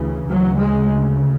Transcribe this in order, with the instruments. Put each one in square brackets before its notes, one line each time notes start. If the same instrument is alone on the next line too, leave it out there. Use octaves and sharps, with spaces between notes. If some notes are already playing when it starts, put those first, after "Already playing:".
Already playing: [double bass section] D2 C#3 E3
D2 C#3 F#3
G#3